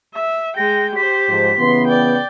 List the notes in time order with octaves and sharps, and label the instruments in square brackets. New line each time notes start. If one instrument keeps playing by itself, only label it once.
[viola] E5
[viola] G#3 G5 [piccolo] A#6
[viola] G4 C5 [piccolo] B6
[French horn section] G#2 F3
[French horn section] C#3 E3 B3 [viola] C6
[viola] D5 G5